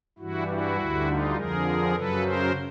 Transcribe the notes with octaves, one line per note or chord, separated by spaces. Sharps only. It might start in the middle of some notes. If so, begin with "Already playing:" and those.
G2 E3 G3 E4 F#4
E4 F#4
D2 D3 G3
D#4 F4
F2 D3 F3 G#4 A#4
F#2 C#3 F#3 A4 B4
A#4 C5